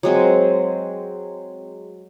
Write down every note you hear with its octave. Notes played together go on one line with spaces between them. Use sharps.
F#3 G#3 C4